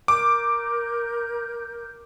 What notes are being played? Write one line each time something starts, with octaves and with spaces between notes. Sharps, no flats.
A#4 D6 G6